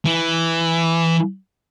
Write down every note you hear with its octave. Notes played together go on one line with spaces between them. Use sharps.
E3